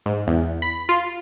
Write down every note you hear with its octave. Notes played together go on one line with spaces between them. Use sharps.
G#2
E2
B5
F4